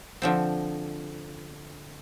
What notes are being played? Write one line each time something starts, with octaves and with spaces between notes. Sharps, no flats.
D3 F3 C4